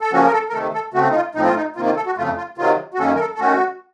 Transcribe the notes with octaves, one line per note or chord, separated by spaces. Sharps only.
A4
C#3 F3 A#3 C#4 F#4
A#4
A4
A#4
C3 D#3 A3 A4
A4
C#3 A3 C4 F#4
D#4
F4
A2 F3 C4 D#4
F4
D#4
C3 D#3 A#3 F4
F4
A4
F#4
F2 C#3 A3 F4
F4
C3 D#3 F#3 F4
F#4
F#2 D#3 A#3 C#4 A4
A#4
A4
A4
D#3 A3 C#4 F#4